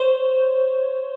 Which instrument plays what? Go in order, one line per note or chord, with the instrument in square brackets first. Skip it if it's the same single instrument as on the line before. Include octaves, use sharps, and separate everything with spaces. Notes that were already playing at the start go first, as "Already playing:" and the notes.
Already playing: [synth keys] C5 C#5